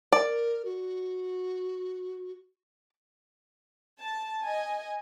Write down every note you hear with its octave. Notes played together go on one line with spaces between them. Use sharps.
A#4 D5
F#4
A5
D#5 G#5